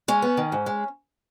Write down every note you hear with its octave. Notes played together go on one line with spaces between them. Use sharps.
G#3 C#4
B3
D#3
G#2
G#3